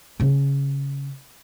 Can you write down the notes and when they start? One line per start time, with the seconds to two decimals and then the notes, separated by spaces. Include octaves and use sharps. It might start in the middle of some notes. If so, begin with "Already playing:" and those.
0.20 C#3 C#4